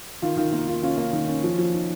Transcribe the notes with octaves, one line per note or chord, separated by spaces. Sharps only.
D#3 F4
D#3 F4
A#3 F4
D#3 F4
C#4 F4
A#3
D#3
C#4
F3
F3
D#4